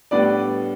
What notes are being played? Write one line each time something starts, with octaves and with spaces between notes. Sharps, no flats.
A2 G3 B3 D4 B4 D5